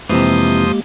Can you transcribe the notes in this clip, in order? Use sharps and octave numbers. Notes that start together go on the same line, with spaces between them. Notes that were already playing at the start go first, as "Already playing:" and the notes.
F2 C3 E3 G#3 A#3 G4 C5 D#6